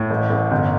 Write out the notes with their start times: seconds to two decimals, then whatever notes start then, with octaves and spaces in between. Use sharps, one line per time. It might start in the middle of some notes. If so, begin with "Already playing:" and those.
Already playing: A2
0.10 A1
0.30 A1
0.51 G1